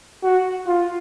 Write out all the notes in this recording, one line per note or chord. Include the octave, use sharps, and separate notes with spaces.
F#4
F4